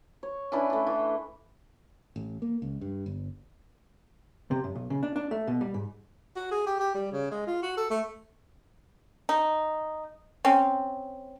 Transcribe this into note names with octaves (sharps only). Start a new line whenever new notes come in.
C#5
C#4 D4 E4 B4
A3 D4
E3
A1
A#3
C#2
G2
G1
C3
F#2
B1
C#3
D4
D4
A3
B2
G3
G#2
F#4
G#4
G4
G4
G3
C#3
G#3
F4
F#4
A4
A3
D#4
C4 C#4